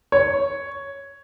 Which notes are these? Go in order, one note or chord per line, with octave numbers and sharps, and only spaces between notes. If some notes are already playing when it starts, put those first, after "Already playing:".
C#5